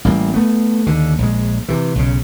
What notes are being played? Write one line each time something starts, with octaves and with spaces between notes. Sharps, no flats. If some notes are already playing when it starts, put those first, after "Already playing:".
A1 G3 A#3
A3 B3
D#2 D3
A#1 G#3
C3 E3
B1 C#3